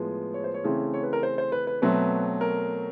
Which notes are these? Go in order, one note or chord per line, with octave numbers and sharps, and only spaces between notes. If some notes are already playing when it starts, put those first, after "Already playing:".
Already playing: A2 F3 G#3 B3
C#5
C5
C#5
C#3 E3 A3 C4
C#5
B4
A#4
C5
C5
B4
B4
B2 F#3 A3 C4 B4
A#4